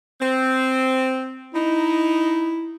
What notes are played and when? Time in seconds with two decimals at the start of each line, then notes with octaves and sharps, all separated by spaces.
0.21 C4
1.54 D#4 E4